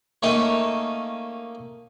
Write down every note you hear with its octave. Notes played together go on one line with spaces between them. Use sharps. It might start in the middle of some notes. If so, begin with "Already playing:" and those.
A3 A#3 C#4 D#4 A4 G5